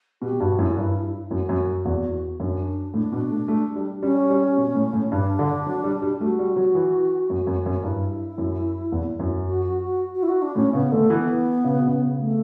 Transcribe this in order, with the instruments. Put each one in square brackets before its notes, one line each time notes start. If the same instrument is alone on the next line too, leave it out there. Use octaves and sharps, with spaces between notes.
[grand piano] B2 [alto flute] G4
[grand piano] G2 [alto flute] F#4
[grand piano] F#2 [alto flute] E4
[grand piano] G2 [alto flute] E4
[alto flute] E4
E4
[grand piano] F#2 [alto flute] F#4
[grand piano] F#2
E2
[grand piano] F#2 [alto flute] D4
[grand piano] A2 [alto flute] D4
[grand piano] B2
A3
A3
G3
[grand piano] G3 [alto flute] C#4
[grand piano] G3
B2
A2
A2
[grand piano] G2 [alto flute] D4
[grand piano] D3
F#3
G3
G3
[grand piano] A3 [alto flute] F#4
[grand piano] G3
F#3
E3
F#2
F#2
F#2
[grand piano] G2 [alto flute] E4
[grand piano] F#2
E2
F#2
[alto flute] F#4
F#4
F#4
F#4
E4
F#4
D4
[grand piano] A2 [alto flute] C#4
[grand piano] C#3 [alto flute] B3
[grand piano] D3 [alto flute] A3
[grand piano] E3 [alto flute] B3
[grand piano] C#3
B2
C#3
[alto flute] A3